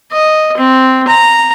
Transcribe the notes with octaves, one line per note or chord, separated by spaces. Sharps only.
D#5
C4
A#5